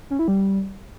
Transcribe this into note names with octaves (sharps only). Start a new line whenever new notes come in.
C#4
E4
G3